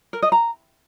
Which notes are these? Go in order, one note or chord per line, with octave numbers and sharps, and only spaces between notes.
A#4
D#5
A#5